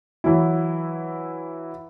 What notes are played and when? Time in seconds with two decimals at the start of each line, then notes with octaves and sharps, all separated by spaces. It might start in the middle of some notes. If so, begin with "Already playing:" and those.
0.24 E3 F#3 E4